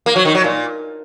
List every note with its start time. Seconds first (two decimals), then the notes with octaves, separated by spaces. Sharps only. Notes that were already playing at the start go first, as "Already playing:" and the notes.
0.06 A#3
0.16 F#3
0.25 D#3
0.35 F#3
0.44 A#2